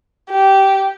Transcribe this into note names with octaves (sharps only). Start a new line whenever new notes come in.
G4